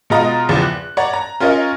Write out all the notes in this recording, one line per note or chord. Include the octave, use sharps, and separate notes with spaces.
B2 G#3 F4 D#5 A#5 D#6
A#1 E2 C#3 F3
F#6
C#5 D5 F#5 A#5
A#5
C#4 F4 A#4 C#5 D#5